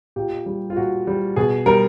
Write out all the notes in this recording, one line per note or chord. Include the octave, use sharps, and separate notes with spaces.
A#2 G4
G3
F4
A#2 F#4
G3
B2 G#4
G3 A#4